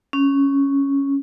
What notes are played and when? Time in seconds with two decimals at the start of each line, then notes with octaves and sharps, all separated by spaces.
0.13 C#4